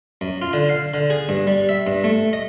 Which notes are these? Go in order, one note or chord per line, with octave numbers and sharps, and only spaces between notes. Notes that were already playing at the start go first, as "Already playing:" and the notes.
F#2
F4
D3
F5
D3
G#4
G2
G3
E5
G2
A3
D#5